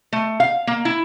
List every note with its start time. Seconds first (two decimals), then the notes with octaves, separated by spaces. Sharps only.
0.13 A3
0.40 F5
0.67 A#3
0.85 E4